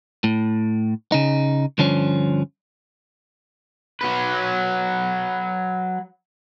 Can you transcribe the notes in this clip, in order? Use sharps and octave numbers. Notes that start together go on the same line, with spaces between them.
A2
C#3 D#4
G2 D3 F3 C#4
F#3 B4